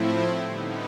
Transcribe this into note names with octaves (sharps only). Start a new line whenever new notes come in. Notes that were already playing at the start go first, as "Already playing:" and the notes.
Already playing: A2 F3 A3 C4 E4
D3 G3 B3 D#4